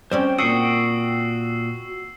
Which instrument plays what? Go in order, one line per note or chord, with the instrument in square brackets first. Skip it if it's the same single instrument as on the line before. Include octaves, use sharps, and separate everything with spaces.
[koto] G3 C4 C#4 [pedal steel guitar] C5 G5
[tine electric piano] A#2 D#6 [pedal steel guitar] F#4 G5 C#6 [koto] F#5 [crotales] E6 C7